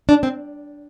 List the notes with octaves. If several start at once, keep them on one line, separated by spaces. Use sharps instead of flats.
D4
C4